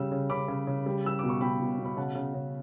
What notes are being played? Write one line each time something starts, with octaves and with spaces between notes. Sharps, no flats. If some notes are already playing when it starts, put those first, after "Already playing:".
Already playing: C#3 G3 E6
C#3
C#3 B5 D6
C#3
C#3
G3
G3 E6
B2 D6
C#6
B2 G5 B5
B2
B2
B5
C#3 F#5 A5
C#3
C#3